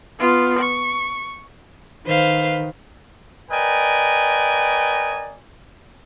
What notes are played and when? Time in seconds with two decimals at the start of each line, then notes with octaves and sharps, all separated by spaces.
0.19 B3 F4
0.59 C#6
2.07 D#3 B4 C5 F5
3.51 A#4 B4 D5 D#5 G5 G#5